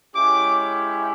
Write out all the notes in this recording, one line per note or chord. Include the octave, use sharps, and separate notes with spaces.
G#3 C#4 E4 G4 D6